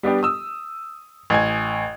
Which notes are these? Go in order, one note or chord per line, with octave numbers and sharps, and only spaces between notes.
G3 B3 D4 G4
D#6 E6
A1 G#5 G#6